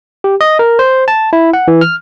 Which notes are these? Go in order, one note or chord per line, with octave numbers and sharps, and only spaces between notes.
G4
D#5
A#4
C5
A5
E4
F#5
E3
F6